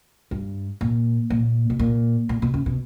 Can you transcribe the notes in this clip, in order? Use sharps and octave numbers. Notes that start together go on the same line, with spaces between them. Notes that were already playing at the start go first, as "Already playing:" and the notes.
G2
A#2
A#2
B2
A#2
A#2
B2
C#3
B2